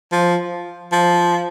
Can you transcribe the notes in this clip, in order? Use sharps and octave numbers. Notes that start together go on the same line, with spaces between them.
F3
F3